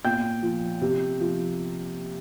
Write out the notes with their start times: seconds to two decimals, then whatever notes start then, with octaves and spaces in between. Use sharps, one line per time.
0.05 A#2 G5 G6
0.43 F3
0.82 C3
1.20 F3